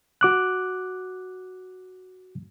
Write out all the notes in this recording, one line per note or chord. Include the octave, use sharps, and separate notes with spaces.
F#4 D6 F#6